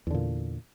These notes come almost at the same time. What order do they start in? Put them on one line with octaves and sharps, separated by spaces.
E2 D3 A#2